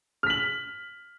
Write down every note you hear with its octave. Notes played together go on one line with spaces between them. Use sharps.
F6 B6 F#7